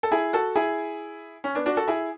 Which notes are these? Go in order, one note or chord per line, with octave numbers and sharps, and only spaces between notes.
A4
E4 G#4
F#4 A4
E4 G#4
C#4
B3 D4
D4 F#4
F#4 A4
E4 G#4